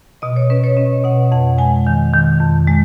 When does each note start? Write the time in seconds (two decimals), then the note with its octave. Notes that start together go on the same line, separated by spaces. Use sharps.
0.22 B2 D#5
0.36 C#5
0.50 C#4 B4
0.64 C#5
0.77 C#4 D#5
1.04 B2 F#5
1.32 F2 F#5
1.58 G#3 G#5
1.87 D#3
2.14 D#3
2.41 F2
2.67 G#3